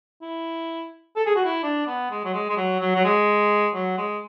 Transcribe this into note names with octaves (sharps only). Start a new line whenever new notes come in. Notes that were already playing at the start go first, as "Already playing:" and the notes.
E4
A4
G#4
F#4
E4
D4
B3
G#3
F#3
G#3
G#3
F#3
F#3
F#3
G#3
F#3
G#3